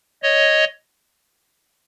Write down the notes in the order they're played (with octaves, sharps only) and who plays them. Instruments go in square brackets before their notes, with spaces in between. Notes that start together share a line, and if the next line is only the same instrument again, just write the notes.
[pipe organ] C#5 D#5